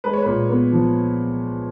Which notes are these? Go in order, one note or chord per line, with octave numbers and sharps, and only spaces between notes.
G#3 B4
C#5
A#2 B4
B3
F3